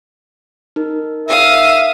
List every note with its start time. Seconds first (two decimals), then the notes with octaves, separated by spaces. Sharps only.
0.76 D#4 A#4
1.29 E5 F5 D#6